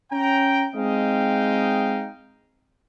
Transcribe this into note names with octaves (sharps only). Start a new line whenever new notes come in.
C#4 G5 A#5
G#3 C4 D#4 D#5 F5 G5